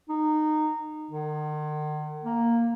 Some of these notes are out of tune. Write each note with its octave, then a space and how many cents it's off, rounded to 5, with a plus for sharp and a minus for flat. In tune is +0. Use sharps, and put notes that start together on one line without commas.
D#4 -20
D#3 -45
A#3 +0